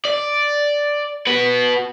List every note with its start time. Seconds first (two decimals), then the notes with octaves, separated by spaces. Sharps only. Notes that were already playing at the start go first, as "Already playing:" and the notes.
0.05 D5
1.27 F#4 B4